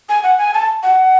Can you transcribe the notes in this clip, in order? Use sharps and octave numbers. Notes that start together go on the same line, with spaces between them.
G#5
F#5
G#5
A5
F#5